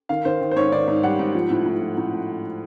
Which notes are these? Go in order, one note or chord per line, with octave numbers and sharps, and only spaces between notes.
D#3 F5
D#3 C5
D#3
C5
G#2 C#5
D#3 D5
G#2
G3 F#5
G#2
F3
A2
A2
F3
A2
A2